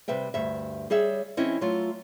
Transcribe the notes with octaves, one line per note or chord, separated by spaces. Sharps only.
C3 G3 B4 E5 G5
D2 G2 E5
G3 G#4 C#5 E5
E3 C4 C#4 E4 D#5
F#3 A3 F4